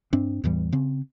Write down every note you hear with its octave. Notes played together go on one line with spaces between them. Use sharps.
G2 C4 D4
E2 A2 E3 G3
C#3 C4